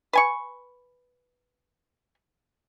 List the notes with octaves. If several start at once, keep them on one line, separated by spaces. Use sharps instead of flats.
B4 G#5 C#6